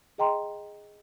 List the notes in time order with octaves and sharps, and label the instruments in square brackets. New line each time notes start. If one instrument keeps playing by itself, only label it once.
[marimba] G#4 D#5 G5 A#5 C6